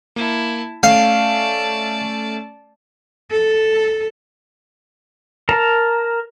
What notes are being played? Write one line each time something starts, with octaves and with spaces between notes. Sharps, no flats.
A#3 E4 A5
A3 C#4 D5 F5 A5 C7
A4
A#4 A5 A#5